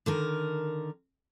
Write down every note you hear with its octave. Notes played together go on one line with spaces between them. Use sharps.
D3 D#3 A#4